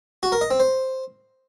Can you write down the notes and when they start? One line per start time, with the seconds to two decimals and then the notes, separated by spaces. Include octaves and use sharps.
0.23 F#4
0.32 A#4
0.41 D#5
0.51 C4
0.60 C5